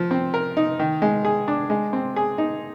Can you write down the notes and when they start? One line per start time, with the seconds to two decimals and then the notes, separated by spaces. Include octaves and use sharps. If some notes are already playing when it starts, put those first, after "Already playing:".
Already playing: F3
0.11 C4
0.34 A#4
0.57 D#4
0.79 D#3
1.02 G#3
1.25 G#4
1.48 D4
1.70 G#3
1.93 C4
2.16 G#4
2.38 D#4